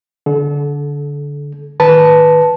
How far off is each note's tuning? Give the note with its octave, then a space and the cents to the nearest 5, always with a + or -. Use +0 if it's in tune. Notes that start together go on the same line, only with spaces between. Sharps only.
D3 -15 A4 -35
D#3 +0 B4 +0 A5 +0